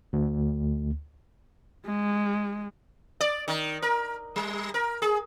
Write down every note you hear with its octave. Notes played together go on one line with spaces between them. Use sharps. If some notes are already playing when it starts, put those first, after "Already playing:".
D2
G#3
D5
D#3
A#4
G3
A#4
G#4